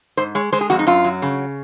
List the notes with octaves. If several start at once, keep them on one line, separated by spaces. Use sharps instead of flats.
G#2 C5
G#3 C#5
G#3 C5
G#4
F2 F#4
D#4
F#2 F4
F#3
C#3